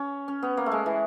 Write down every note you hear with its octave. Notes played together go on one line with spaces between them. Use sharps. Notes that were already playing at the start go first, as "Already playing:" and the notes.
Already playing: C#4
C#4
B3
A#3
A3
G#3
E3